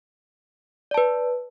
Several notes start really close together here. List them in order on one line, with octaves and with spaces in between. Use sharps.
D5 A5 B4